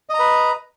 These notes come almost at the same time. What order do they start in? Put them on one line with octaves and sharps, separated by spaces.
D#5 A#5 B4